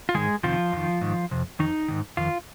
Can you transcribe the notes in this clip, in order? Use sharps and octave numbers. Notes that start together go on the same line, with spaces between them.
F4
G#2 D#3 G#3 G#4
F2 C3 D#3 F3 F4
F2 D#3
G#2 D#3
F2 C3
F2 D#3 D#4
G#2 D#3
F2 D#3 F4